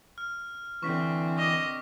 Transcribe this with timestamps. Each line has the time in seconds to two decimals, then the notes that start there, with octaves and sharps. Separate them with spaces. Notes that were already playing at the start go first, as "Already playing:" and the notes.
0.18 F6
0.83 D3 E3 C4 C#6 B6
1.38 D#5 D6 A#6